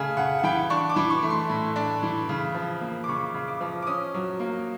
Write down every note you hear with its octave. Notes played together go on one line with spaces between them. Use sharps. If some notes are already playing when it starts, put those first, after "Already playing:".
Already playing: C#3 A3 G#5
C#3 F#5
F#5
E3 G5
D4 C#6
D6
E3
C#6
A3
C6
A2
D4
E3
C#3
F3
A#3
D6
C#3 C#6
C#3
D6
F3
D6
C#4 D#6
F#3
A#3